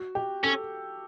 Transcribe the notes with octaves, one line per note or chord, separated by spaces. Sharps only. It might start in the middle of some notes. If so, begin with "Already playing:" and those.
Already playing: F#4
G4
C#4 A4